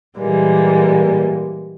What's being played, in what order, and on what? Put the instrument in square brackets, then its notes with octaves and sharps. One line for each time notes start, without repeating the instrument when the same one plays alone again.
[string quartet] A#2 E3 G3 G#3 A#3